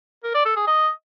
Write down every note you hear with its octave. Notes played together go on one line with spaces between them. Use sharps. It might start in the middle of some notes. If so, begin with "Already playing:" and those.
A#4
D5
A4
G#4
D#5